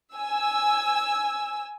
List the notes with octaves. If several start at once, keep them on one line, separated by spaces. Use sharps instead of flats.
G#5 E6